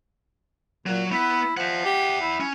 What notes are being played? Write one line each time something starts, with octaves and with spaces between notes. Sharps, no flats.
A#2 F#3
B3 E4
F3 E5 F#5
G4
E4
C#4